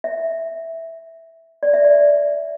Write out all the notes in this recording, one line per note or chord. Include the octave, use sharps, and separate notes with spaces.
E5
D5
E5
D5